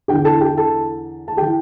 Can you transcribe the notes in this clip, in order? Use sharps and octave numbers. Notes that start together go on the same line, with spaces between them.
E2 D3 G4 G5
A4 A5
G4 G5
A4 A5
A5
G4 G5
E3